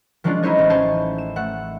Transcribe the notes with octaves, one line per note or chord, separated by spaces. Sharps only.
F3 F#3 G#3 C#4 D4 F4
D#4 E4 C5 C#5 D#5
A1
C5 C#5 A5
E7
A3 F#5